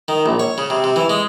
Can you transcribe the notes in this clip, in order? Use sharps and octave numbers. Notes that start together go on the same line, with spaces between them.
D#3
A#1
C#5
C#3
C3
C3
E3
G#3